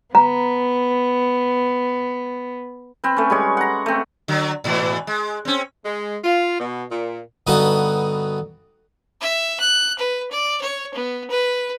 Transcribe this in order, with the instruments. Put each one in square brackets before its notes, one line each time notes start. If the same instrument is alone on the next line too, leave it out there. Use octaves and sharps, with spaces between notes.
[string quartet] B3 [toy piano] A#5
[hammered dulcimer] C4 B4
A3 C#4
G3 G#3 C#5
F#5 A#5
A3 C4
[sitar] D3 F#3
G#2 B2 E3
G#3
C4 C#4
[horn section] G#3
F4
B2
A#2
[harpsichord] G2 D3 B3 D#4 F#4 D#6
[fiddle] E5
F#6
B4
D5
C#5
B3
B4